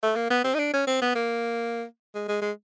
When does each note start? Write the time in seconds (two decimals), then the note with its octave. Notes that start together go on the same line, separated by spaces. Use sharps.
0.03 A3
0.16 A#3
0.30 B3
0.44 C4
0.54 D#4
0.59 D4
0.73 C#4
0.87 C4
1.02 B3
1.15 A#3
2.15 G#3
2.28 G#3
2.42 G#3